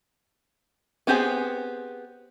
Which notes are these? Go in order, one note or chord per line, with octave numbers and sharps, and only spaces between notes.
B3 C4 G4 G#4 G#5